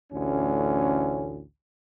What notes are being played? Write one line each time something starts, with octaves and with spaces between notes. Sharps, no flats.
A1 D2 C#4